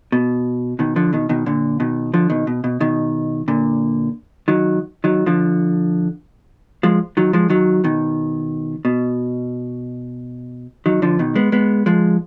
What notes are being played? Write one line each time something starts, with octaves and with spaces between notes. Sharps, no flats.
B2
B2 D#3
D3 F3
B2 D#3
B2 D#3
A#2 D3
B2 D#3
D3 F3
B2 D#3
B2
B2
B2 D#3
A#2 D3
D#3 F#3
D#3 F#3
D3 F3
F3 G#3
D#3 F#3
F3 G#3
D#3 F#3
B2 D#3
B2
D#3 F#3
D3 F3
B2 D#3
G#3 B3
G#3 B3
F3 G#3